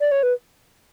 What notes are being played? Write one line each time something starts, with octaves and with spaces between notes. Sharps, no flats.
D5
C#5
B4